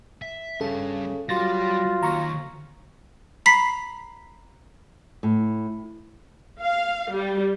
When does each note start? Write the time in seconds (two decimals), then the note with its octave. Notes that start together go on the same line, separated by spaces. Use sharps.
0.22 E5
0.61 G2 C#3 A4
1.29 F#3 G3 F4 C6 A6 A#6
2.03 D#2 A#5 C#6 A#6
3.46 A#5 B5 B6 C7
5.23 A2
6.61 F5
7.12 G3